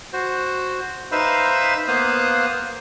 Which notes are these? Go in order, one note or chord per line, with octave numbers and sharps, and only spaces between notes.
F#4 C5
D#4 B4 C5 E5 F5 B5
A#3 B3 C5 F5 D#6 F#6